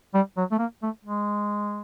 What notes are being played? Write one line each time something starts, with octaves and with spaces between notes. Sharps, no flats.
G3
F#3
A3
A#3
A3
G#3